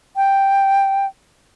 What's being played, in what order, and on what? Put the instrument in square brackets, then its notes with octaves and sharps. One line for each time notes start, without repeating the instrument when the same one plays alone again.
[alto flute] G5